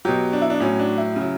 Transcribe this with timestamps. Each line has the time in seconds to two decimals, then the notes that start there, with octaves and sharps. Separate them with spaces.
0.05 B2 F#3 G4
0.33 D4
0.42 E4
0.50 D4
0.60 A2 F#3 C#4
0.79 D4
0.97 E4
1.16 C#3 F#3